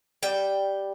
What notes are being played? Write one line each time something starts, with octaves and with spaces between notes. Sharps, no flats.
G3 G5